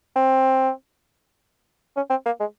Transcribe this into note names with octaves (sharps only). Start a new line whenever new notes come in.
C4
C#4
C4
A#3
G#3